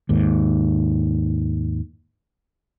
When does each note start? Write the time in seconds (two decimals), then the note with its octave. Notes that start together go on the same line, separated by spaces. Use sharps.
0.09 D#2 G#2